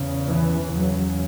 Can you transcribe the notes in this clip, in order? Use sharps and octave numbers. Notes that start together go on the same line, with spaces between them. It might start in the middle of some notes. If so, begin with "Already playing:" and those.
Already playing: E2 C#3
E3
E2 C#3 F#3